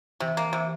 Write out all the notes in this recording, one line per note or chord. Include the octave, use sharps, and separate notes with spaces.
C3 E3
A#3
C3